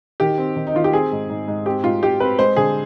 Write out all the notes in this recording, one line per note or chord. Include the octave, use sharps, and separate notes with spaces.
D#3 G4
C4
D#3
D#4
D#3 F4
G4
C4 G#4
G#2
G#2
G#2
C4 G4
G#2 F4
G#2 G4
C4 B4
G#3 C5
D3 G#4